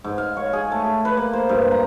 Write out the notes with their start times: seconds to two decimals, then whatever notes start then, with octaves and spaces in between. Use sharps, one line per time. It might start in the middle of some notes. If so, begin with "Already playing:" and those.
0.04 G#2
0.18 F5
0.37 C#5
0.53 G#4
0.72 A3
0.84 G#4
1.05 B4
1.17 A#3
1.33 C5
1.49 G2
1.72 A#5